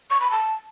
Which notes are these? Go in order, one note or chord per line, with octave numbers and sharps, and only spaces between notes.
C#6
B5
A5